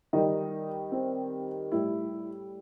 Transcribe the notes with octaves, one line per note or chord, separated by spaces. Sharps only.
D#3 G3 D#4
C4
A2 G3 E4